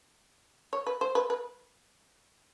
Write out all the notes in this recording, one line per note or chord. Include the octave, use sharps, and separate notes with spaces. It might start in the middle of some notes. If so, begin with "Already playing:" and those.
C#5
B4
C5
B4
B4